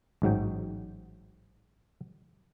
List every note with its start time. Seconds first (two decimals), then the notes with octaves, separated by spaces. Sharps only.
0.22 A1 G#2 F#3 G5